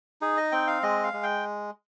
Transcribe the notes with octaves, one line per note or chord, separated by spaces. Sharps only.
D#4 G#4
D#5
C4 G5
F5
G#3 D#5
F5
G#3
G5